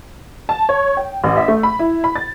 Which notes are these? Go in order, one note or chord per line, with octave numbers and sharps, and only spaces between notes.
A5
C#5
G5
A1
E5
A3
B5
E4
B5
A6